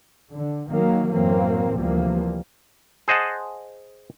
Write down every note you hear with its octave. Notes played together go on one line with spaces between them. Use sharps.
D3
D#3 F#3 A#3
F#2 A2 E3 F#3 A#3 C4
D2 C3 E3 F3 G3 A#3
G#4 C5 D#5 F#5 A5